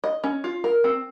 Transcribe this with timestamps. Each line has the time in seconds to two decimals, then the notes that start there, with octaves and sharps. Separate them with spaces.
0.04 D#5
0.24 C#4
0.44 F4
0.64 A#4
0.84 C4